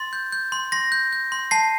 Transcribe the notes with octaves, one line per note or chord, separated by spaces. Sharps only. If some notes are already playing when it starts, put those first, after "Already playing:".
Already playing: C6 A6
G6
G6
C6
C6 A#6
G6
G6
C6
A5 C7